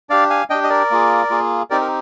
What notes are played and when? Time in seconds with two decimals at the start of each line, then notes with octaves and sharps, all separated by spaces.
0.10 D4 G4 D5 F5
0.30 F5 G#5
0.50 D4 G4 D#5 G5
0.64 D#5
0.70 A#4 D5
0.91 A#3 F4 G#4
1.30 A#3 F4 G#4
1.70 C4 D#4 G4 A#4 D5
1.81 A#4